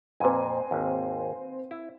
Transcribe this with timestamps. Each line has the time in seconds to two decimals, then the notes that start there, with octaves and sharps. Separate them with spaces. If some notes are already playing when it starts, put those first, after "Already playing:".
0.20 F2 A#2 C4 B4 G#5
0.71 G#1 D#2
1.71 E4